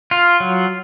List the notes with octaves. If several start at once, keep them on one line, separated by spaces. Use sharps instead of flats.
F4
F#3